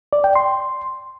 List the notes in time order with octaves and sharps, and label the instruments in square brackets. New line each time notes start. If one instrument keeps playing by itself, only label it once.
[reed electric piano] D5
G5
C6